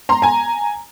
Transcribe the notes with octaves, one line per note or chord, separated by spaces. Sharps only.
A#5 C6
G#5 A#5